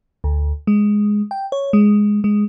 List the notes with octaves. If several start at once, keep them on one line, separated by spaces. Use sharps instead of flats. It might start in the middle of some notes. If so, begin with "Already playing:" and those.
D2
G#3
G5
C#5
G#3
G#3